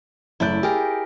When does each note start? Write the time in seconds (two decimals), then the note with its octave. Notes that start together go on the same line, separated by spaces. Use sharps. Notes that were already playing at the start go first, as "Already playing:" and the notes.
0.40 F#1 A3 E4 D5 G6
0.63 G4 G#4 A#4